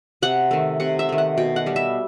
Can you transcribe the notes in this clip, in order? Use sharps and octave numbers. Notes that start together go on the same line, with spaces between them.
C3 F#5
D#3 A3
C3 F#5
E5
D#3 A3
F#5
B2 G5
F#5
G3 B3
E5